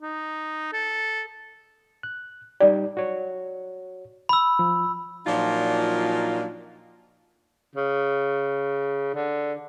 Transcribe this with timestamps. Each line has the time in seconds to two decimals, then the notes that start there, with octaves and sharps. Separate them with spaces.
0.02 D#4
0.73 A4
2.03 F#6
2.60 G3 D#4 G4 D5
2.97 F#4 C#5
4.29 B5 E6
4.59 F3
5.27 A#2 F3 F#3 D4 D#4 F4
7.75 C#3
9.15 D3